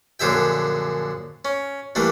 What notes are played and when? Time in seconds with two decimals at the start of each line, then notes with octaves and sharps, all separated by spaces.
0.20 A#1 F#2 D3 G#4 E5 G5
1.45 C#4
1.95 E3 G3 A3 A#3 D4